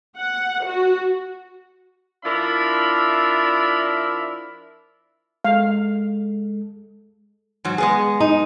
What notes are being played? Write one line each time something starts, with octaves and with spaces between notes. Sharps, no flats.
F#5
F#4
F3 D4 E4 A#4 E5 B5
G#3 A4 F5
G#2 F#3
G#3 B3 G#4
D#4